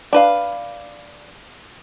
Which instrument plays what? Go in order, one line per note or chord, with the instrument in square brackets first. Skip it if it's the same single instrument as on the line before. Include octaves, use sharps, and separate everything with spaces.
[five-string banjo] D4 B4 F5